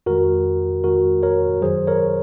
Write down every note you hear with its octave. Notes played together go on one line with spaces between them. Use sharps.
F2 D#3 G#3 F#4 A#4
F2 D#3 G#3 F#4 A#4
A#4 C#5
F#2 D#3 F#3 G#4 C5
A#4 C#5